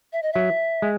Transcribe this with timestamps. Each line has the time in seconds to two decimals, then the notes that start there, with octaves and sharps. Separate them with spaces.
0.13 E5
0.23 D#5
0.33 F#3 E5
0.82 G#3